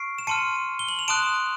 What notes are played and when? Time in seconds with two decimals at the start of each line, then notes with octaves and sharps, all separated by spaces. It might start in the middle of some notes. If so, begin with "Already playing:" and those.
Already playing: C#6 F6 C7 D7
0.18 E7
0.27 A5 C6 F6 C#7 D#7
0.79 G7
0.89 F#7
0.99 F7
1.08 A5 C6 D#6 F#6 D7 E7